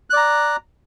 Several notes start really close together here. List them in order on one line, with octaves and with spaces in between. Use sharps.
F#6 D5 A#5